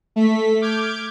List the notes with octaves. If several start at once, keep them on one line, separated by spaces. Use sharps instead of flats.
A3 B6
D6 F6 G6 G#6 D7